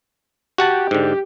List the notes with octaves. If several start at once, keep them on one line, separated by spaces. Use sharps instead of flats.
F#4 G4 F#5 A5
G#2 D3